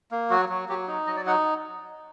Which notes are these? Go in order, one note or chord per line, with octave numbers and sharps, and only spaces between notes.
A#3
F#3 F#4
F#3
F#3 G4
D#4
F#3 D#5
D5
D#4 F#5